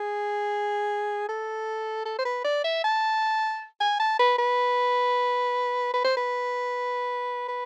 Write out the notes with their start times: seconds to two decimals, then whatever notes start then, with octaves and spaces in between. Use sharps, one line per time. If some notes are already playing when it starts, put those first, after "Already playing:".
Already playing: G#4
1.29 A4
2.05 A4
2.19 C5
2.25 B4
2.45 D5
2.64 E5
2.84 A5
3.80 G#5
4.00 A5
4.19 B4
4.39 B4
5.94 B4
6.04 C5
6.17 B4
7.48 B4